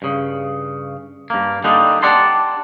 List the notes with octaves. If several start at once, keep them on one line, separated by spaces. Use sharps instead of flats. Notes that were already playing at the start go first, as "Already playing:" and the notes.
G2 C#3
G2 A#3
D3 G3 A#3 D4 D#4
D4 G4 D5 F#5 A5 C6